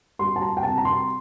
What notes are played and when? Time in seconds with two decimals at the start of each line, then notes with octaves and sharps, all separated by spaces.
0.19 G3 C6
0.36 A5
0.42 A#5
0.57 G5
0.63 C3 A5
0.78 A#5
0.85 C6